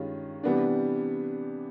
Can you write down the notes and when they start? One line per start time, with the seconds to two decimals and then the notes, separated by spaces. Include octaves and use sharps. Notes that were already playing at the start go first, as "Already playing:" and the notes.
Already playing: G2 D#3 G#3 C#4 F4
0.43 C3 E3 G3 B3 D4